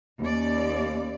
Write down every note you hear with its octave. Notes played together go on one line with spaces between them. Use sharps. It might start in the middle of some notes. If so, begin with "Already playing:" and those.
D#2 C#4 D5